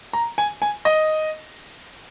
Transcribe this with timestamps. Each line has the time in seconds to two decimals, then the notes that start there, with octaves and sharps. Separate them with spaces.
0.13 A#5
0.38 G#5
0.62 G#5
0.85 D#5